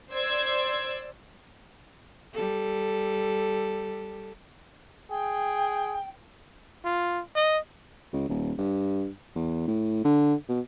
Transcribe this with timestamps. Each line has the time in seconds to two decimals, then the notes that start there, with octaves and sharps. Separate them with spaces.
0.13 C5 D5 E6 G#6
2.33 G3 A4
5.11 G#4 G5
6.85 F4
7.36 D#5
8.13 C#2
8.29 D#1
8.58 G2
9.36 E2
9.67 A2
10.05 D3
10.49 B2